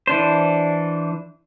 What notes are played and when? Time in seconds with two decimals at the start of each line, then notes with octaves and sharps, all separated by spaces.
0.07 E3 D4 C5